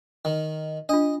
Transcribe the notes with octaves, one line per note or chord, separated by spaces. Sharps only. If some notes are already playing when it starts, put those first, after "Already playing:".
D#3
D4 F4 D#5